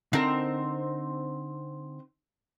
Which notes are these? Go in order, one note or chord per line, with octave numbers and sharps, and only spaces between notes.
D3 C4 D#4 A#4